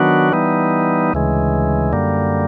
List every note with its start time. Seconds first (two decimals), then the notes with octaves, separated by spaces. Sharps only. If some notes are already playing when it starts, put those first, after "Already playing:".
Already playing: D#3 F#3 B3 D4 F#4
0.32 E3 G3 B3 D#4
1.13 D2 C#3 E3 G#3
1.93 F#2 D3 G3 A#3